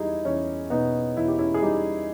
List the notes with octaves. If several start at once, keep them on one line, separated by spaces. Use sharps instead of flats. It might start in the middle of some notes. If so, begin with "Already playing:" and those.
Already playing: E2 G3 D#4 E4 G4 G#4
E2 C#4 E4
B2 B3 D#4
E2 E4
G4
C#4 E4
G#4
G3 D#4 G4